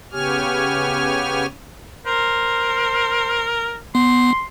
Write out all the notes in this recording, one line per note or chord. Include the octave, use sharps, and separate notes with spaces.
C#3 B3 G4 C#5 G#5 F6
A#4 C5
B3 C6